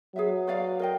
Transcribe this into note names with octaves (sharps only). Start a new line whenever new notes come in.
F#3 G#4 B4 E5
F#4 B4 D5 F5
A#4 D#5 G5